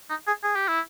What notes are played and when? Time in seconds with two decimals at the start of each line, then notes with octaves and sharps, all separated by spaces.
0.10 D#4
0.27 G#4
0.44 G#4
0.55 G4
0.68 E4